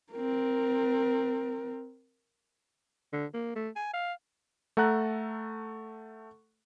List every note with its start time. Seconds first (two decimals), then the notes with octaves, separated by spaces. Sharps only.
0.13 C4 A#4
3.13 D3
3.34 A#3
3.56 A3
3.76 G#5
3.93 F5
4.77 A3 A4 F#5 A#5 F#6